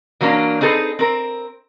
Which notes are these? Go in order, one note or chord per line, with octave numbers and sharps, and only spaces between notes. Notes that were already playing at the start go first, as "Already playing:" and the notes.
E3 F#3 A#3 C#4 D4
C4 D#4 G#4 A4 B4
C4 A#4